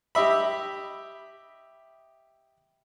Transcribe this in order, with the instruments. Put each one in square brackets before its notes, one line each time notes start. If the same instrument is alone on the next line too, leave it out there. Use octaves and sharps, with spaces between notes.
[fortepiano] G4 D#5 E5 B5